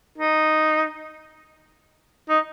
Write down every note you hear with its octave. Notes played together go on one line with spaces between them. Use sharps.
D#4
D#4